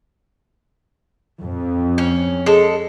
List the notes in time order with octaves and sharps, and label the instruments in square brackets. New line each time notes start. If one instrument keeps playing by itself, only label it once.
[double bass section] F2
[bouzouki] C#4
G#3 A4